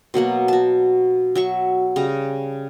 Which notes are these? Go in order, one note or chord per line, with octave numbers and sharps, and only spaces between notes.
B2 F#3 A#3 F#5
F#4 A5
F#3 E5 C#6
C#3 G3 A#5